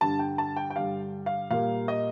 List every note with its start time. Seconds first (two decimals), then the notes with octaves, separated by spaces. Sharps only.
0.01 G2 D3 G3 A5
0.19 G5
0.38 A5
0.56 G5
0.70 G5
0.76 G2 D3 G3 F5
1.26 F5
1.51 A#2 G3 A#3 F5
1.88 D#5